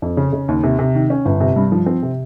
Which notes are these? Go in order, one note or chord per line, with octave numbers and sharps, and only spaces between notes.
F2
C#3
C#3
D#2
C3
C3
D#3
C#4
G1
C3
G2
F3
C4
C3